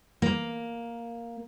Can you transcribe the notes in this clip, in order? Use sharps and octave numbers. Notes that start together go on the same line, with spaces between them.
A#3